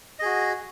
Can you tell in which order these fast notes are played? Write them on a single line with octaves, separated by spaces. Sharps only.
D#5 G#4 F#4